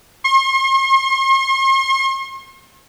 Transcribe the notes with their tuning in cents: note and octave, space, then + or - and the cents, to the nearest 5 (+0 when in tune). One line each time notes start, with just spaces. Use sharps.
C6 +45